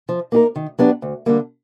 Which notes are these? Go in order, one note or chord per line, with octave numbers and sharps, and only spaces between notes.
F3
A#3 D#4 G4 A#4
D#3
F#3 B3 D4 G4
D2
D3 G3 A#3